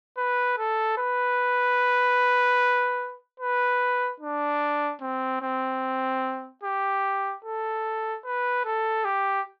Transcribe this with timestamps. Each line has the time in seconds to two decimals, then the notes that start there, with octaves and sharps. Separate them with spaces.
0.18 B4
0.58 A4
0.98 B4
3.40 B4
4.21 D4
5.01 C4
5.42 C4
6.64 G4
7.45 A4
8.25 B4
8.65 A4
9.05 G4